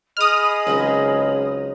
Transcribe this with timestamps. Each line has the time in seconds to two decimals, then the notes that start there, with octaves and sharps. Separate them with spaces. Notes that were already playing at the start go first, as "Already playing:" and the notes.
0.17 G#4 D#5 B5 D#6 F6
0.67 C#2 F#3 C4 D#4